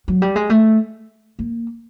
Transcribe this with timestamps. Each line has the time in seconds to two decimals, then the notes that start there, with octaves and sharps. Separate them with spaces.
0.08 F#3
0.22 G3
0.36 G#3
0.50 A3
1.39 A#3